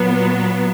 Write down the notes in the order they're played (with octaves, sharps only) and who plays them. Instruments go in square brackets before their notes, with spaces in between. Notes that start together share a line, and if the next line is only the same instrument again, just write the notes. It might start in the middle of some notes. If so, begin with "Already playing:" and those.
Already playing: [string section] A#2 F#3 B3